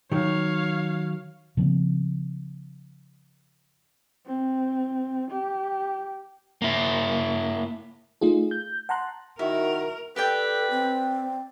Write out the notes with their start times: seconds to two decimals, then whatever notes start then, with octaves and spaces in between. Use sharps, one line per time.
0.12 D#3 F#3 C#5 F5
1.57 C#3 F3 A#3 C4
4.27 C4
5.31 G4
6.62 A#3 E4
8.21 A3 D#4 F4 G#4
8.51 G6
8.89 F#5 A5 A#5 C6 F#6
9.39 D#3 E4 F#4 A#4 E5
10.16 G4 A4 B4 D5 G5
10.70 C4